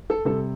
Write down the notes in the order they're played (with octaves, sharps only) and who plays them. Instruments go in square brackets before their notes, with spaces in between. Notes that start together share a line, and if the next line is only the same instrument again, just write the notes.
[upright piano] A4
C3 G3 A4